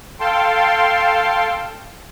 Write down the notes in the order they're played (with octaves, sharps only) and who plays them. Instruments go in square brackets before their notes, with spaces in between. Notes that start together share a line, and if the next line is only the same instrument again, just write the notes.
[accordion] A4 F5 G5 A5 C6